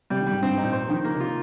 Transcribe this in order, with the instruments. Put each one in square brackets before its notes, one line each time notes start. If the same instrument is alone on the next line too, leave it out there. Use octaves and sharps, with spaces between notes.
[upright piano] C3 [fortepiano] G3
[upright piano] D#3
[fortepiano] G3
[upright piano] G#2
[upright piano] G2 [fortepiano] C4
[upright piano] G#2
[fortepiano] D#4
[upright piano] A#2
[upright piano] G3 [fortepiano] C5
[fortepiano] D#3 [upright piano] F3
[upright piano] C#3 [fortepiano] A#3
[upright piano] C3
[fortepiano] F4